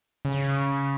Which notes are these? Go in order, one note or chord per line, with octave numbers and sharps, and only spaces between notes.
C#3